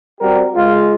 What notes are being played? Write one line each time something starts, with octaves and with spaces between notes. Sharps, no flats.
G3 C4 F#4 G4 A#4
G#3 F4